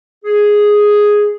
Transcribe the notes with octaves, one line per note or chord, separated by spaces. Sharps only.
G#4